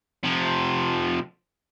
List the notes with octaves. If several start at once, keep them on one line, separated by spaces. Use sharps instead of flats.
C3 F3